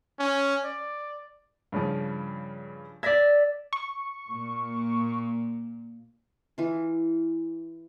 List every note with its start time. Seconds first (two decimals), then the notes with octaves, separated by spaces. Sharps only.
0.20 C#4
0.64 D5
1.72 G2 C#3 F3
3.03 D5 E5 G#6 A#6 B6
3.73 C#6
4.29 A#2
6.58 E3 F4